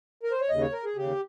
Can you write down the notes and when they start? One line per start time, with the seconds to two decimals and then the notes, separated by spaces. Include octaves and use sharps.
0.23 A#4
0.32 C5
0.41 C#5
0.50 D#2 C#3 D#5
0.61 C#5
0.73 A#4
0.84 G#4
0.96 D#2 C#3 G4